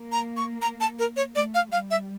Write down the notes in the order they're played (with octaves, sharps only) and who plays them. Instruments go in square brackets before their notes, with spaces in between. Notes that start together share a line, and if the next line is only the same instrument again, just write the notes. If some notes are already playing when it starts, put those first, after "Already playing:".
Already playing: [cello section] A#3
[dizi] A#5
C#6
A#5
A5
A#4
C#5
[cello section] A3 [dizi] D5
[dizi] F5
[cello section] G3 [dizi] F5
[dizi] E5